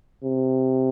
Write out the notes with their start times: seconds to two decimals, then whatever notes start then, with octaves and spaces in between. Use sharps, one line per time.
0.24 C3